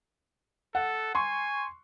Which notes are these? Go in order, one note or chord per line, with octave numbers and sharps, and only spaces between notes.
A4 F#5
G#5 C6 C#6